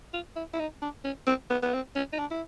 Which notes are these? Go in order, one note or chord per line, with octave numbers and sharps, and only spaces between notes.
F4
E4
E4
D#4
D4
C#4
C4
B3
B3
C4
C#4
D#4
D4
E4